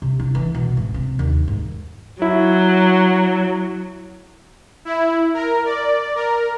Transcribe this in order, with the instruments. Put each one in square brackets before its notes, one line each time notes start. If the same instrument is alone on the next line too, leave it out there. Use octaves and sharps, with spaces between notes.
[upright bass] C3
E4
E3
B2
G#1
C3
D#2
G#2
[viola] F#3 [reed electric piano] E4
[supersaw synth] E4
A#4
D5
A#4